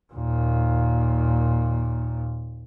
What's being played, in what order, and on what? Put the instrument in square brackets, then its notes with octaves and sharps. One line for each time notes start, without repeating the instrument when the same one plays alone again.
[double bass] D#2 A#2